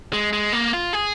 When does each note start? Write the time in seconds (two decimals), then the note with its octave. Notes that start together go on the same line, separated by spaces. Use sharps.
0.13 G#3
0.33 G#3
0.53 A#3
0.73 F4
0.93 G#4